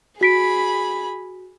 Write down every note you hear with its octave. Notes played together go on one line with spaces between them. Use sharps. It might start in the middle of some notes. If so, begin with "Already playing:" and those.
F#4 G#4 B5 B6 D7